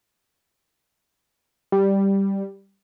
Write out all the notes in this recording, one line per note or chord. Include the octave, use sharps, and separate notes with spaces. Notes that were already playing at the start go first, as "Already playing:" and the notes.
G3